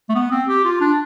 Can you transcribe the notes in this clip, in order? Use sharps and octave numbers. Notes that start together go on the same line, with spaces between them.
A3
B3
C4
G4
F4
D4